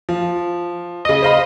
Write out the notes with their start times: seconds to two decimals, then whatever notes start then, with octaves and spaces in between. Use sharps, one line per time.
0.09 F3
1.05 C#3 D#5 D#6
1.22 C5 F5 B5